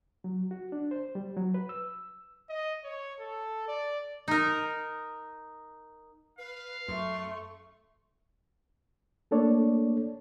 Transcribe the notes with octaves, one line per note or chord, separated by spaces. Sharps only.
F#3
F#4
D4
C5
G3
F#3
B4
E6
D#5
C#5
A4
D5
D#4 A#4
B4 F5
F#2 A3 C6 C#6
A3 A#3 D4 A4 C#5 D5